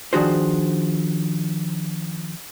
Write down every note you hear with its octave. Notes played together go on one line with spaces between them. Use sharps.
D#3 F3 D4 F#4 G#4 C5